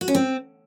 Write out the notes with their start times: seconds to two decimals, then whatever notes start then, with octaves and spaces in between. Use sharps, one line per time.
0.01 F#4
0.08 C#4
0.15 C4